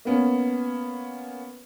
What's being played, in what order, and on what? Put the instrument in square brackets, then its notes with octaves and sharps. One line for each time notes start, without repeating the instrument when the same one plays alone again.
[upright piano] A#3 B3 C#4